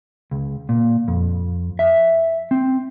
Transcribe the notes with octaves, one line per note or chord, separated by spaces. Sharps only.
C#2
A#2
F2
E5
C4